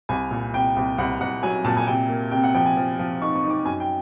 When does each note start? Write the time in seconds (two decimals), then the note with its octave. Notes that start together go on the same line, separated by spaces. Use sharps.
0.09 C2 G#5
0.31 A#2
0.53 C2 G5
0.76 C2
0.98 C2 F#5
1.20 C2 F#5
1.43 F#3 G#5
1.64 A#2 A5
1.77 G#5
1.87 C3 G5
2.09 A#3
2.31 C3 G5
2.44 F#5
2.54 F3 G5
2.66 G#5
2.77 F3
2.99 F3
3.21 D#4 C#6
3.36 C#6
3.44 D#4
3.50 D6
3.65 F#2 G#5
3.80 G5